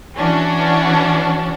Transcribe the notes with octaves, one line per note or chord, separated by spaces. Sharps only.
E3 C#4 D4 F#4